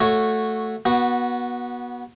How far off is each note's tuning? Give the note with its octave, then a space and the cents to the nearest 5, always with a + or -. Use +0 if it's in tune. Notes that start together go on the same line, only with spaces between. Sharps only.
A3 +0 F#4 -10 C#5 +0
B3 -25 F#4 +0